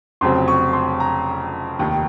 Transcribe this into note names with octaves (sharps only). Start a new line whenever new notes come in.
F1 F2 C#3 F#3 C4 C6
C#6
C6
A#5
F1 D#2 D#3